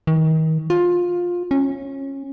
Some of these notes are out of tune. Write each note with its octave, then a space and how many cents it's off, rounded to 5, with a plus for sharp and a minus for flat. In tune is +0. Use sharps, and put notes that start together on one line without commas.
D#3 +35
F4 +15
C#4 -20